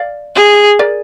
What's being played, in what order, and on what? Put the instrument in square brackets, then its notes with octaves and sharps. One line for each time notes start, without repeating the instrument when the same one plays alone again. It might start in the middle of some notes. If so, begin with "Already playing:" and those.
Already playing: [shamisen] D5 F5
[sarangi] G#4
[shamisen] A#4 D5